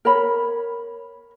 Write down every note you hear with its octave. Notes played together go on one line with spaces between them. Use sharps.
A#4 C#5 B5